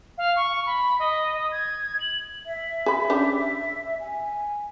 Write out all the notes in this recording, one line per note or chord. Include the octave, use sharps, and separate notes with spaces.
F5
C#6
B5
D#5
D#6
G#6
F#7
E5
G#4 B5
C#4 D4 G4
G#5